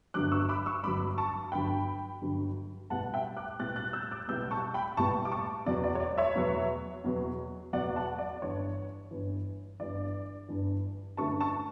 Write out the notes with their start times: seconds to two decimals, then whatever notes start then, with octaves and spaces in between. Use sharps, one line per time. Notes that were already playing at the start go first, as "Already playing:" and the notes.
0.14 G1 G2 D3 F#3 D6 F#6
0.32 C#6 E6
0.49 B5 D6
0.66 C#6 E6
0.83 G1 G2 D3 F#3 B5 D6
1.18 A5 C#6
1.52 G1 G2 D3 F#3 G5 B5
2.21 G1 G2 D3 F#3
2.90 B1 A2 G3 B3 F#5 A5
3.14 E5 G5
3.37 D6 F#6
3.59 B1 A2 G3 B3 F#6 A6
3.76 F#6 A6
3.93 E6 G6
4.11 D6 F#6
4.28 B1 A2 G3 B3 E6 G6
4.51 A5 C#6
4.74 G5 B5
4.97 B1 A2 G3 B3 A5 C#6
5.25 D6
5.31 A5 C#6
5.66 E2 B2 F#3 B3 D5
5.84 D5
5.95 C#5
6.00 D5
6.18 C#5 E5
6.35 E2 B2 F#3 B3
7.04 E2 B2 F#3 B3
7.73 E2 B2 F#3 B3 D5 F#5
7.96 F#5 A5
8.19 D5
8.42 G1 G2 E3 C#5
9.11 G1 G2 E3
9.80 G1 G2 E3 D5
10.49 G1 G2 E3
11.17 G2 D3 A3 C#4 E4 A5 C#6
11.40 A5 C#6